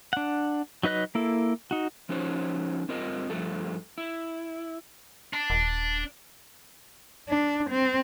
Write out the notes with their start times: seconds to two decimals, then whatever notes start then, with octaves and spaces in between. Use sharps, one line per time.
0.13 D4 F#5
0.83 F#3 D#4 B4 D#5 F#6
1.15 A#3 E4 A4
1.71 D#4 F#4
2.09 F3 C#4 D#4 F#4 C5 C#5
2.89 G2 C4 F4 A#4 D#5
3.30 G2 F3 A3 A4
3.98 E4
5.33 D4
5.50 D#1
7.29 D4
7.71 C4